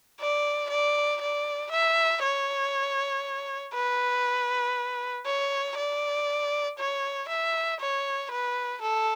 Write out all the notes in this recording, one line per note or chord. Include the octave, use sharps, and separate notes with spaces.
D5
D5
D5
E5
C#5
B4
C#5
D5
C#5
E5
C#5
B4
A4